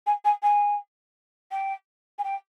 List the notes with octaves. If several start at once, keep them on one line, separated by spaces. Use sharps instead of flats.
G#5
G#5
G#5
G5
G#5
G5